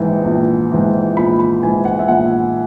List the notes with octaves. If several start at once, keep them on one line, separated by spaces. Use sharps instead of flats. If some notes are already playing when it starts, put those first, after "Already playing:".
Already playing: A#1 G#2 E3
A#1
G#2 E3
A#1 B5
B5
G#2 E3 G#5
F#5
E5
A#1 F#5